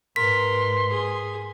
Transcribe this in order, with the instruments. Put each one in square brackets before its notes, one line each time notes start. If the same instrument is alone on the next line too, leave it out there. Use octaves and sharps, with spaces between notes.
[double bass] G#2 [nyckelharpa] A#4 B4 [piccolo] C6 [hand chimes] B6
[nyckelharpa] G#4